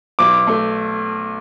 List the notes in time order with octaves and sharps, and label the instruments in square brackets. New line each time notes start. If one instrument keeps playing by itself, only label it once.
[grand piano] B1 [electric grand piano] D6
[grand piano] A3